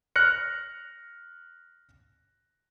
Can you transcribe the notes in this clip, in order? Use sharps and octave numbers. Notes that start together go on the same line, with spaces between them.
F6 F#6 A#6 C#7